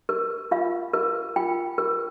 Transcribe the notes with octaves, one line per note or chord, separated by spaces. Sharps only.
A#4
F4 F5
A#4
F4 G5
A#4